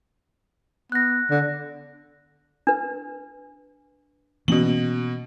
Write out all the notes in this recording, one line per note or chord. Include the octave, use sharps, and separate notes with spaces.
B3 F#6 A#6
D3
D4 B4
B2 E3 A#3 C#4 F#7